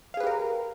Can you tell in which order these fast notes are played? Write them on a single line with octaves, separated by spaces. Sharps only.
F5 G#4 B4 G4 A#4